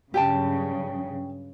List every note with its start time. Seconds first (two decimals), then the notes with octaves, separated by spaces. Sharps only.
0.14 G2 C#3 F#3 G4 G5 A5